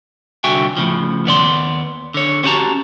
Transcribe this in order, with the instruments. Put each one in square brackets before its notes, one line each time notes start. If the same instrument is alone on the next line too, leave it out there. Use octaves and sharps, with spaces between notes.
[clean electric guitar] C2 D3 F#4 E5 G5 G#5
A2 C#3 F3
D#2 B3 D5 C6
D3 C#5
B3 C#4 F#4 G4 A5 A#5